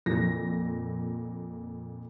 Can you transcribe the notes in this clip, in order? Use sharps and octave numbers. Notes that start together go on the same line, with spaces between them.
F2 A#2 A#6